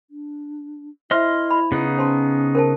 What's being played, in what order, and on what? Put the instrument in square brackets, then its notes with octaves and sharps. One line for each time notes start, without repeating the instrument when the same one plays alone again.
[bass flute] D4
[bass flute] E4 [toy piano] C5 E5 [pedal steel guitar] D#5 C6 F6
[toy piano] B5
[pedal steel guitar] C#3 B3 D#4
[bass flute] C#4 [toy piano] C5 A5 C6
[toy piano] A#4 C5 A5